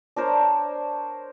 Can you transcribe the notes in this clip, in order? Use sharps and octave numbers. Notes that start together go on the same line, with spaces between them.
D4 A#4 C5 C#5